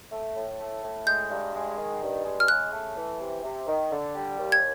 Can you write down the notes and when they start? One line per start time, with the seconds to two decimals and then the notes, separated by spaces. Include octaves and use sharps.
0.12 A3
0.35 A2
0.59 A3
0.83 A2
1.07 G#3 G6
1.30 G2
1.54 G#3
1.78 D#3
2.02 G2
2.25 G#3
2.40 F6
2.48 C#3 F#6
2.73 A3
2.96 E3
3.20 C3
3.44 C3
3.67 D#3
3.91 D3
4.15 G3
4.39 D#2
4.52 G#6